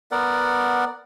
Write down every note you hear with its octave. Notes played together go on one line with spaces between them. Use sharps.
B3 A#4 D5 F#5